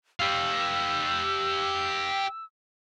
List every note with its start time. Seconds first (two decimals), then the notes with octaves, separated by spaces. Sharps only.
0.20 G4 F5 E6